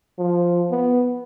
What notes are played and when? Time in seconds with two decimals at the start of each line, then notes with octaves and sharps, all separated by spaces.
0.19 F3
0.71 B3